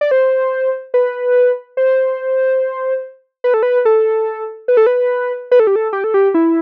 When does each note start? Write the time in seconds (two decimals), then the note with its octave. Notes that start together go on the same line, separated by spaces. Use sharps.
0.01 D5
0.11 C5
0.94 B4
1.77 C5
3.44 B4
3.54 A4
3.63 B4
3.85 A4
4.68 B4
4.77 A4
4.87 B4
5.52 B4
5.60 A4
5.67 G4
5.76 A4
5.93 G4
6.04 A4
6.14 G4
6.34 E4